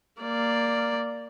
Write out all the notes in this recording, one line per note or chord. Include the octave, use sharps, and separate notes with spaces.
A#3 D5